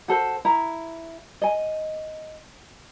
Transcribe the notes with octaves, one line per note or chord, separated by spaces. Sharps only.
F#4 A4 C5
E4 A#5
D#5 G#5